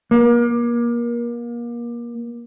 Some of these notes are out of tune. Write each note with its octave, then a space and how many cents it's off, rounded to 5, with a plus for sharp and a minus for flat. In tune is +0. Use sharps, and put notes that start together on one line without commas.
A#3 +30